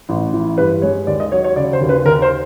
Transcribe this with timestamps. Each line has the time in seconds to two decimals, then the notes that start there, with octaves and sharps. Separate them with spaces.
0.09 A1
0.33 E3
0.57 G2 B4
0.82 G#3 C#5
1.07 D#2 D5
1.20 D#5
1.32 F#3 C#5
1.44 C#5
1.56 C#3 D5
1.73 C5
1.81 D#2
1.89 B4
2.05 D#2 A#4
2.22 C5